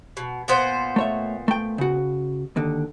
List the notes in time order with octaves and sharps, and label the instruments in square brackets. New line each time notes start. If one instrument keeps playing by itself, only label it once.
[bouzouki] B2
A#2 B3 C5
[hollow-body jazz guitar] A3 C#5 E5
A3 G5
C#3 F#4
D#2 D3